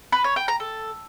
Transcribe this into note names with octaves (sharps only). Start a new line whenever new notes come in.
B4
C#5
G5
A#5
A4